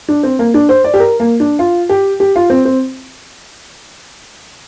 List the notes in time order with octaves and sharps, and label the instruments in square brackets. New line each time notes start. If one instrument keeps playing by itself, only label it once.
[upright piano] D4
C4
A#3
D4
C5
D5
G4
A#4
A#3
D4
F4
G4
G4
F4
C4
C4